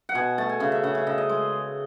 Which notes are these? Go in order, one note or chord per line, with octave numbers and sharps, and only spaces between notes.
F#5
B2 G#5
A3 A5
G#5
C#3 E5
E5
C#3 F#5
E5
C#3 D#5
D#5
G#3